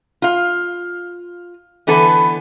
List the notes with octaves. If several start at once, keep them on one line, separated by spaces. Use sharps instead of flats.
F4 F5
D3 E3 B3 A4 B4